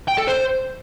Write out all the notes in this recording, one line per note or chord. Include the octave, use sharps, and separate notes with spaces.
G5
A4
C5